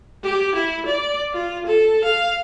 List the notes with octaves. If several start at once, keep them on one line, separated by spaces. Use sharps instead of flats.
G4
E4
D5
F4
A4
F5